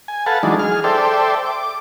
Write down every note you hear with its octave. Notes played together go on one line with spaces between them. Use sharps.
G#5
A4 B4 F5 F#5 A5
E3 F#3 G#3 D4 D#4
G#4 F6
A4 C5 D5 E5 G5
D6